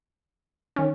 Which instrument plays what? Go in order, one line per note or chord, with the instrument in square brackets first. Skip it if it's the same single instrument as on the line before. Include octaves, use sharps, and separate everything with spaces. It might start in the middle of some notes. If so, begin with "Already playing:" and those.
[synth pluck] D#3 C#4